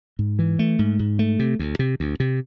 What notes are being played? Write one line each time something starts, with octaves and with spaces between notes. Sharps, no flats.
G#2
E3
A3
G#2
G#2
A3
C3
D2
C3
D2
C3